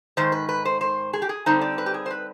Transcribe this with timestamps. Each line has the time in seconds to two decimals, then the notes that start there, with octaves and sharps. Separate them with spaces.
0.17 G#2 D#3 C5
0.32 B4
0.49 B4
0.65 C5
0.81 C5
1.13 G#4
1.22 G4
1.29 G#4
1.46 D3 G3 C4 D#4 C5
1.61 D5
1.78 B4
1.86 G4
1.94 G#4
2.06 C5
2.10 B4